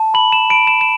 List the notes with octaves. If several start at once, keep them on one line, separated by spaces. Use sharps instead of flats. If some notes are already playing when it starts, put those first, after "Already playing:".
Already playing: A5
B5 F#7
E7
B5 D7
E7
E7